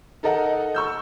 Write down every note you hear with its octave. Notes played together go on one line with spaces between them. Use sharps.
D#4 A4 A#4 D#5 F#5
C#6 E6 G6